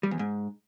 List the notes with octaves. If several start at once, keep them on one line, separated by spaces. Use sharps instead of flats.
G3
E2
G#2